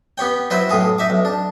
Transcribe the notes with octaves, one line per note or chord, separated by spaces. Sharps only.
B3 G4 C#5 G5
F#3 E4 F4 B4 C5
B1 A2 G#4 F5
D#4 E5 D6
B1
D4